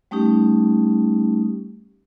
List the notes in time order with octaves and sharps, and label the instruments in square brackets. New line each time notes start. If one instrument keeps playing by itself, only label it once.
[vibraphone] G3 A3 C#4 D#4 G4